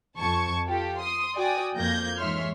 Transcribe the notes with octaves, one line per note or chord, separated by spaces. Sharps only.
F2 A5 C#6 G#6
F4 G4 A4
C6 D#6
F#4 D5 G5 G#5 D#6
F2 A#3 G6 G#6 A#6
G#2 E3 C#5 E5 C6 F6